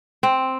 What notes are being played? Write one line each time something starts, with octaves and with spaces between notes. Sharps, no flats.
C4